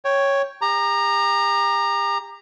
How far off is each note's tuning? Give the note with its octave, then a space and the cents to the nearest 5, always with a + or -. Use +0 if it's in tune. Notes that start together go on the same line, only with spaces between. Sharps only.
C#5 +0 G5 +0
G4 +40 A#5 +0